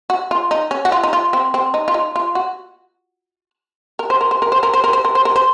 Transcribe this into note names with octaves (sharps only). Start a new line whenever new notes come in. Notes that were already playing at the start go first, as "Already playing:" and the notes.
F#4
F4
D#4
C#4
F#4
F4
D#4
F4
C4
C4
D#4
F4
D#4
F4
F#4
A#4
C5
A#4
C5
A#4
C5
A#4
C5
A#4
C5
A#4
C5
A#4
C5